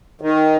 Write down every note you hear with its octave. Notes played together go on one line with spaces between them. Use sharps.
D#3